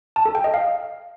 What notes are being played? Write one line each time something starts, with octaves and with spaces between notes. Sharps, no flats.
A5
A4
G5
D#5
F5